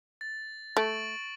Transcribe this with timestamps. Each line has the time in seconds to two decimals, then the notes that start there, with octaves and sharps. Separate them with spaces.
0.21 A6
0.77 A3 C#6 D7 F#7